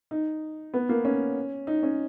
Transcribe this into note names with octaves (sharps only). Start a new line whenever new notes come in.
D#4
B3
A#3
C#4
D#4
C#4